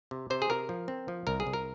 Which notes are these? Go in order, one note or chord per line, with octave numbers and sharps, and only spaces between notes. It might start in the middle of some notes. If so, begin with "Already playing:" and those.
C3
C3 C5
G#4
C3 A#4
F3
C4
F3
C2 A#4
G#4
C2
A#4